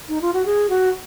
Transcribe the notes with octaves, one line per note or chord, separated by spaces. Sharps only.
D#4
F4
F#4
G#4
F#4